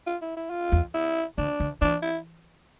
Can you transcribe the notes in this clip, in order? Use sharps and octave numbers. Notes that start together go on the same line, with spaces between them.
F4
E4
E4
F4
E2
E4
D3 D4
D3
E3 D4
E4